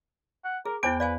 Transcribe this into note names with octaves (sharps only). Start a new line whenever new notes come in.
F#5
G#4 A#4
E2 B3 E4 C5 G5 D6
B4 D5 F5 G#5